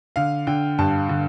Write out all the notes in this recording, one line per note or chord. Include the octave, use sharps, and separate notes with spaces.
D3 F5
D3 G5
G2 A5
D3